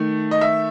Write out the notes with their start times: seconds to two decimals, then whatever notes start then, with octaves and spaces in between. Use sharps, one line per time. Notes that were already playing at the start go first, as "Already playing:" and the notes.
Already playing: D#3 A3
0.31 D#5
0.41 E5